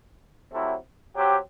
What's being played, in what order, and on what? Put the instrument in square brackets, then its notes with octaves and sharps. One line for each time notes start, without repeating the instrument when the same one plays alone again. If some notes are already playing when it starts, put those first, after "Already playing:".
[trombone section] C3 F#3 A3 C4 E4
F#3 C4 G4